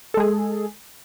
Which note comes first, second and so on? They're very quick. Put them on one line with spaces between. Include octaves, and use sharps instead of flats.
A4 G#3 G#4